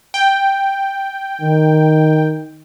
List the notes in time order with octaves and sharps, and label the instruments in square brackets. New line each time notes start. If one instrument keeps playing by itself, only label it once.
[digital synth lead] G5
[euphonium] D#3